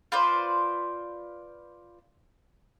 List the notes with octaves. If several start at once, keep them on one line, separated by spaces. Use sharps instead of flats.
F4 B4 C5 D5